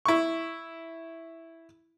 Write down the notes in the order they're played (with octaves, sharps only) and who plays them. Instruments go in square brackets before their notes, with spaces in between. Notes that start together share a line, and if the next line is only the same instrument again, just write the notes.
[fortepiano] E4 C#6